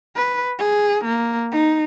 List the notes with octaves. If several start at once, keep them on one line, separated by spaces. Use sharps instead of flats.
B4
G#4
A#3
D#4